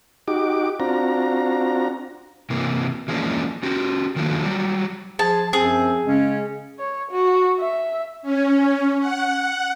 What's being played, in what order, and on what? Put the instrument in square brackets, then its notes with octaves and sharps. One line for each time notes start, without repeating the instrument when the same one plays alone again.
[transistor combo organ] D#4 F#4 G4 D6
C4 D4 F4 F#4 A#5
[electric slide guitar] C3 E3 A#3
E3 F3 G#3 A#3 C#4 D4
C#4 F#4 G4
D#3 F3 F#3 A3 A#3 D4
F#3 G3
[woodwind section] F3 G#4 [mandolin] A5
[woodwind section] F#2 F3 C4 [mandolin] G#4
[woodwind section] C#3 G#3 C#4
[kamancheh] C#5
F#4
E5
[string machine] C#4
F#5